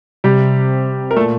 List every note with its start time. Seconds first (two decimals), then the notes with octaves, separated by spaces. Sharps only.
0.24 C3 G3 G4
1.11 A#4
1.16 A#2 A3 A4